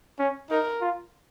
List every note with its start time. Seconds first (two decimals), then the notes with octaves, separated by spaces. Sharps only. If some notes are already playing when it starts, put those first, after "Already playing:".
0.19 C#4
0.50 D#4 A#4
0.81 F4